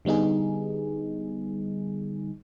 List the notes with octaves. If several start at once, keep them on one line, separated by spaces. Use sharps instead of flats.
D3 G3 B3 D#4 G#4